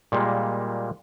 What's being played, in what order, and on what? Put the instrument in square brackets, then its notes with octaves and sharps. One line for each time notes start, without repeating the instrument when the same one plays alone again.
[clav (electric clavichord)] A#2 G3 G#3 A#3